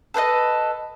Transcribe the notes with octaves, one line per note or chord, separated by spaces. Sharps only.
A4 B4 C5 D#5